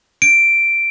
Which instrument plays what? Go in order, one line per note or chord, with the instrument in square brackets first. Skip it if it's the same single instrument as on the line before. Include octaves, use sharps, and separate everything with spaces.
[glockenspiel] D7